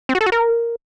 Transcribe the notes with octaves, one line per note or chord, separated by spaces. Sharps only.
C4
F#4
A4
F#4
A#4